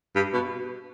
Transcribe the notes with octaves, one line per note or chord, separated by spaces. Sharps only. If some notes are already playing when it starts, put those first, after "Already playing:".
G2
B2